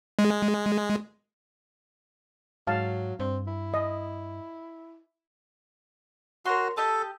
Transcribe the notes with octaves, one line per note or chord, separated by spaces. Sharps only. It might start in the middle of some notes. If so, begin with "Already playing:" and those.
G#3
G#2 F#3 F5 A5
G2 C4
E4
D#5
F#4 A#4 C#5 C6
G4 A4 D#5 A5